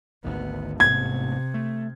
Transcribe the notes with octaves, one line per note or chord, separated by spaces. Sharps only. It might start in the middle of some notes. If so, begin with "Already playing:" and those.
G#1 D2 D#3 B3
A1 G#2 C3 B3 G#6
A3